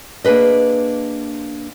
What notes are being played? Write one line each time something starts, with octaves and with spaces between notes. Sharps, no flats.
A#3 D4 G#4 B4 D#5